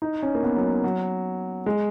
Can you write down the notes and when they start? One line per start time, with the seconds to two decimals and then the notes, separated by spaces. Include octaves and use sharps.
0.02 D#4
0.23 C#4
0.35 A#3
0.43 B3
0.56 F#3
0.84 F#3
1.66 G#3